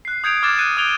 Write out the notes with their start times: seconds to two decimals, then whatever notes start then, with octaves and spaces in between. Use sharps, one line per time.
0.05 F#6 C7
0.24 D#6 G6 G#6 C#7 D7 F7
0.43 D6 F6 F#6 G#6 A6 E7
0.59 F#6 C#7 D#7
0.77 D#6 G#6 D7 F7 G7